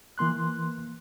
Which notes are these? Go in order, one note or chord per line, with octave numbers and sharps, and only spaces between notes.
E3 A#3 C6 F#6